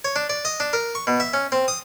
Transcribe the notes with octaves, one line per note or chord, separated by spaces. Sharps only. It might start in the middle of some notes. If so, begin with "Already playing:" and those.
C#5
D4
D5
D#5
D4
A#4
C#6
B2
E5
C#4
C4
D#6